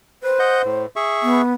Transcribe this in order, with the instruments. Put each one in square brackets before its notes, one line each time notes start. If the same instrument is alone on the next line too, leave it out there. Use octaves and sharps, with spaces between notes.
[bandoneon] B4 [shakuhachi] C5
[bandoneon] D#5 F#5 G6
A2
G#4 E5 C#6
[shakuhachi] B3